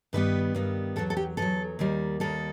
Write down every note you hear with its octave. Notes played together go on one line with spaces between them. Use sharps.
G2 D#3 G3 B3 B4
G2 D#3 G3 B3
E2 D#3 F#3 A4
A4
G4
E2 D#3 F#3 A4
D#2 D#3 G3
D#2 D#3 G3 A4